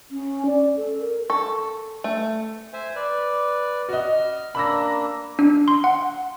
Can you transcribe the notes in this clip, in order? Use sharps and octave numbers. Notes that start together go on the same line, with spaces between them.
C#4
D5
A4
A#4
A4 C#6
A3
C5 E5 G#5
B4 D5
F#4 D#5 F6
A#3 D4 B5 E6 A#6
D4
C6
F#5